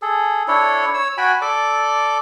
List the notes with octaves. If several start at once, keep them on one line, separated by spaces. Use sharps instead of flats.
G#4 A4
D4 E4 A4 C#5
C#5 E6
F#4 G5 G#5 B5
A4 D5 D6